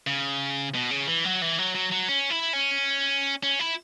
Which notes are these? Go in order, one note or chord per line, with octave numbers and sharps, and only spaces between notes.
C#3
B2
C#3
E3
F#3
E3
F#3
F#3
F#3
C#4
E4
C#4
C#4
E4